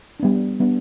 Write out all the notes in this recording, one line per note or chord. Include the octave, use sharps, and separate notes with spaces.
G3 B3 D4
G3 B3 D4